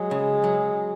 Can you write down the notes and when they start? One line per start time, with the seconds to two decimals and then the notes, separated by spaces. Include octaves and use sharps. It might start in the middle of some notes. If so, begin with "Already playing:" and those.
Already playing: F#3 G#3
0.11 C#3
0.44 F#3